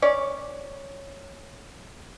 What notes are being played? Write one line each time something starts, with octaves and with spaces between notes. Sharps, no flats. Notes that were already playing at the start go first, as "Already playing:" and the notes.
C#4 C#5 D5